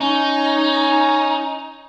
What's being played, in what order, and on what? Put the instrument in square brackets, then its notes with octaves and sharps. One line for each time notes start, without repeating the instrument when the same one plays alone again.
[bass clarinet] C#4 [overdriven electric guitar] D#4